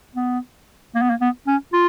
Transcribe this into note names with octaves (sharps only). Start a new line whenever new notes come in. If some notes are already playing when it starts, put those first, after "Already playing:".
B3
A#3
B3
A#3
B3
C#4
F4